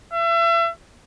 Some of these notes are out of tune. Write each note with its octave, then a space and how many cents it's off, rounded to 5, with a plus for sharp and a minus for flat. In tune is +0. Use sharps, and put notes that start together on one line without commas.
E5 +35